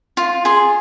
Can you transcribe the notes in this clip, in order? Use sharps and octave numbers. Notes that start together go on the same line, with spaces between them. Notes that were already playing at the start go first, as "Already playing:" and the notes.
F4
G#4 C6